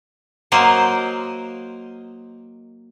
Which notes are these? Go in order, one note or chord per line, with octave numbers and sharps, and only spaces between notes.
F#3 A#3 A#4 C5 D#5